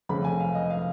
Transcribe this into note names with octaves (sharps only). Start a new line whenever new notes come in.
F1 F2 C#3 B5
G#5
F5
D#5
F5